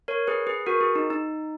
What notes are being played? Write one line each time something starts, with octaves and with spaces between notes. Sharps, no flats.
A#4 C#5
G#4 B4
G#4 B4
F#4 A#4
G#4
D#4
D#4